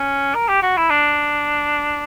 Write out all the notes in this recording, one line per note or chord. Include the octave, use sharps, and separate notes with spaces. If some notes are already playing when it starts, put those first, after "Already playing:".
Already playing: C#4
A#4
G4
F#4
E4
D4